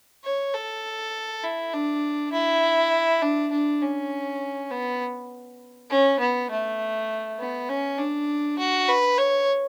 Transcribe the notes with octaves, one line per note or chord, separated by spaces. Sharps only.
C#5
A4
E4
D4
E4
D4
D4
C#4
B3
C#4
B3
A3
B3
C#4
D4
F#4
B4
C#5